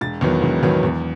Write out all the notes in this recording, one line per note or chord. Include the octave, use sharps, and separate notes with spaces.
E1 A6
E2 D#3 F#3 B3
E1
E2 D#3 F#3 B3
E2